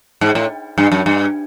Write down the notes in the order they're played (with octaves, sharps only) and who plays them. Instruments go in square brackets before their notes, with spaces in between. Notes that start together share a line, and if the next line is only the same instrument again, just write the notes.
[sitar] G#2
A2
G2
F#2
G2